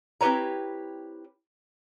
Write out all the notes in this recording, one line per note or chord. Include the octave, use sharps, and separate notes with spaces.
C4 E4 G4 B4 C#5 A#5